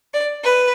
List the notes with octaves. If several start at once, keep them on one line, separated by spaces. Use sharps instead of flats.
D5
B4